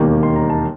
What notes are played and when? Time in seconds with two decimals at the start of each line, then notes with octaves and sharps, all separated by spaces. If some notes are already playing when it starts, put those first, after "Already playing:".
Already playing: E1 D#2 D#3 G3 A#3
0.23 C6
0.36 A#5
0.50 A5